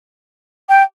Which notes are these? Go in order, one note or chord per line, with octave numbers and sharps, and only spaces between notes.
G5